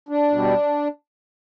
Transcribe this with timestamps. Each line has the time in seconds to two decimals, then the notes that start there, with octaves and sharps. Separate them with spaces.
0.09 D4
0.31 B2 G3